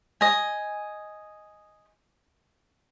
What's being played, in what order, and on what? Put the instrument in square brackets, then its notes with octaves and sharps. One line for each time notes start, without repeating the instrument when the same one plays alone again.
[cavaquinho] D#5 G#5